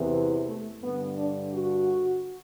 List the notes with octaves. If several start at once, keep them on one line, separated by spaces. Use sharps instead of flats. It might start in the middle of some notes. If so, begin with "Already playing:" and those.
Already playing: E2 C3 E3
A3
G2 D3 B3
D4
F#4